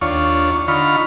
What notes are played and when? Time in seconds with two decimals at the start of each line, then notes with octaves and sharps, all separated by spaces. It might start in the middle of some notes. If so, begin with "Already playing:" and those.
0.01 D#2 D4 F4 C#5 C#6
0.68 D3 D#4 F4 B5 C#6 F6